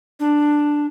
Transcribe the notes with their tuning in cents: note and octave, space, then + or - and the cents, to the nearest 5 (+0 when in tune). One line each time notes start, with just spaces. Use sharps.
D4 +5